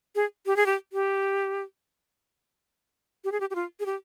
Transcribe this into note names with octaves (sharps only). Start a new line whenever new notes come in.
G#4
G4
G#4
G4
G4
G4
G#4
G4
G4
F4
G#4
G4